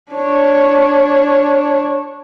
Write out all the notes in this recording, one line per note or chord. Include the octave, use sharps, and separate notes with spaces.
D4 C#5